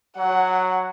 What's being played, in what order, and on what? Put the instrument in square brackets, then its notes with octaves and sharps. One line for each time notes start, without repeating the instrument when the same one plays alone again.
[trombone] F#3 [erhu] F#5